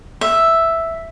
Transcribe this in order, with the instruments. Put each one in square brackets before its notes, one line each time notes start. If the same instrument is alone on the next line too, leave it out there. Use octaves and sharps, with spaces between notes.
[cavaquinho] E5